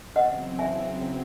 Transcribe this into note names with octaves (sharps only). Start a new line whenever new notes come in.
E2 C#3 F#3 C4 D#5 F#5
E5 G#5